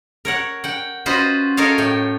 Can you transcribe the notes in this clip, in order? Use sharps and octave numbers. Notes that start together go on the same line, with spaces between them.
A#4 C#5 F#5
F#5 G5
C#4 F4 F#4 B4 C5 D#5
A4 A#4 C#5 D#5 F5
A2 G5